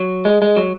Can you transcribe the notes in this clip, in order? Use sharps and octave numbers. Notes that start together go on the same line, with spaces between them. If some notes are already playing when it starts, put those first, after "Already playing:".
Already playing: F#3
G#3
G#3
F#3